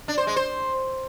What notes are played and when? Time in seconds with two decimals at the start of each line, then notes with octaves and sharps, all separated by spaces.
0.08 D4
0.18 C5
0.27 G#3
0.36 C5